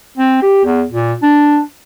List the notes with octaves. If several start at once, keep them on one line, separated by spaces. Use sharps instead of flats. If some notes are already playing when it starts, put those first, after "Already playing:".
C4
G4
E2
A#2
D4